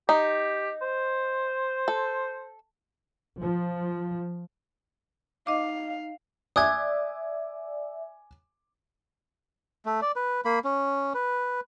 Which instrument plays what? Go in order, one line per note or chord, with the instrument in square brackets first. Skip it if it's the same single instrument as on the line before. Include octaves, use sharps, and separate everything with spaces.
[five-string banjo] D#4 [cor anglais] G4
[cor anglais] C5
[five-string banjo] A4
[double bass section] F3
[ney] D#4 [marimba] D#5 D6 [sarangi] F5
[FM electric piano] D5 E5 [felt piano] G#5 D6 [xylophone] D#6 F#6 G#6
[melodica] A3
D5
B4
A#3 B5
C#4
B4